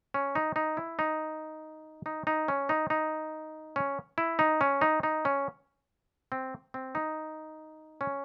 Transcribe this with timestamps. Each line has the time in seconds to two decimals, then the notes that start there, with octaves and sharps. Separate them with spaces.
0.14 C#4
0.35 D#4
0.56 D#4
0.77 E4
0.99 D#4
2.06 D#4
2.27 D#4
2.48 C#4
2.69 D#4
2.90 D#4
3.76 C#4
4.18 E4
4.39 D#4
4.61 C#4
4.81 D#4
5.03 D#4
5.25 C#4
6.32 C4
6.74 C4
6.95 D#4
8.01 C#4